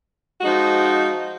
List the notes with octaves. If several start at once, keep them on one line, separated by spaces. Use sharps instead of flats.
F3 G#3 D#4 F#4